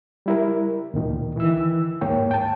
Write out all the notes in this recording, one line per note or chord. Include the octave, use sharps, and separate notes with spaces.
G3 E4 A#4
D2 A#2 D#3
D#3 E3 E4 E6
D#2 G#2 A#3 C#5 G5
G5 A5